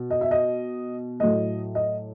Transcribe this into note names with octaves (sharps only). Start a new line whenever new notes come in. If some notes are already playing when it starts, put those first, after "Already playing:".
Already playing: B2
D#5
E5
D#5
A2 F#3 A3 D#5
D#5